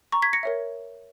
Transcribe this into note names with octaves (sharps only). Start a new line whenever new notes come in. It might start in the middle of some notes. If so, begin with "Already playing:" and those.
A#5 C#6
G#6 B6
A#6 C#7
A#4 C#5 E5